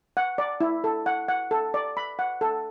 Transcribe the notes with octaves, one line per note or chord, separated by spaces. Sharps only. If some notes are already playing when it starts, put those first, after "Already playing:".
F#5
D5
E4
A4
F#5
F#5
A4
D5
B5
F#5
A4